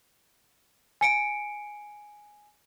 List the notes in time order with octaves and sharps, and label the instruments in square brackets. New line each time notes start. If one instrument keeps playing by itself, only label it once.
[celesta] G#5 C#7 D7